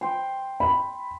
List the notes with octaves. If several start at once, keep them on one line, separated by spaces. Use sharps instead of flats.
G5 C6
B5